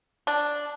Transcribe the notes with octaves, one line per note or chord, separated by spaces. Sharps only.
D4